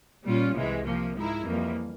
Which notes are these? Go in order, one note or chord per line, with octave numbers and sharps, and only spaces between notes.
A#2 G3 C#4 F4
C2 C3 E3 G#3
C3 F3 A#3
G#2 F3 G#3 E4 A#4
F2 E3 G3 A#3